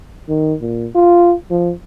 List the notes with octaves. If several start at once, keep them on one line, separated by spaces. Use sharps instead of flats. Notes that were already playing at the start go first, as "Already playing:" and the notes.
D#3
A#2
F4
F3